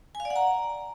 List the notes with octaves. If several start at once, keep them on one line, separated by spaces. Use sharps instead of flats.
G#5
F5
D5
F#5
A#5